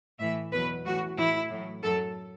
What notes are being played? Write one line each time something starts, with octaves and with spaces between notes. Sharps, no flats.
A2 E3 E5
E2 B2 F#3 B4
A2 E3 F#4
A2 E3 E4
A2 F#3
F#2 F#3 A4